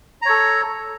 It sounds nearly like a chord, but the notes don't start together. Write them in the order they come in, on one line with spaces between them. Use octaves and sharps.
A#5 C#5 A4